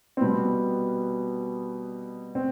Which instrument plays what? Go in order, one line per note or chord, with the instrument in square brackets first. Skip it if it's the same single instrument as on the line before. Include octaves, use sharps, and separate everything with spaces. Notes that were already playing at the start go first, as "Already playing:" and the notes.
[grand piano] C4
B2 G3 B3
C4